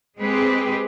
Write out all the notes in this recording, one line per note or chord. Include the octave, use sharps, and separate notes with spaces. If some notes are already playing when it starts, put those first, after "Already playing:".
G#3 C4 G4 G#4 B4